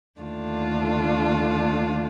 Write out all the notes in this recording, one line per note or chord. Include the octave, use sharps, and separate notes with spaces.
D#2 D3 A3 D4 F4